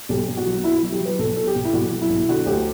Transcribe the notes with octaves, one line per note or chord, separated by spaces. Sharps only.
B1 G4
B1
F#4
F#3
B2 E4
F#3 E4
G4
F#3 B4
B1 A4
B2 A4
G4
B1
E4
B1 F#4
F#3
E4
B1
D3 F#4
D2 G4